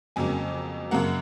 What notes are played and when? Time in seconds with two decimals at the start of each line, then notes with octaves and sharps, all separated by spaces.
0.16 F2 C#3 F#3 A#3 G#5
0.91 F#2 C#3 F#3 A#3 F#5